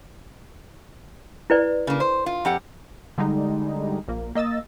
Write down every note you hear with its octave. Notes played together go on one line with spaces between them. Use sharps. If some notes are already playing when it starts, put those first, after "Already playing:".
E4 B4 D5
C#3 A#3
C5
F4
F2 G4 F#5
D3 G3 G#3 D#4
A#1 A#3
A#3 D#5 E6 A6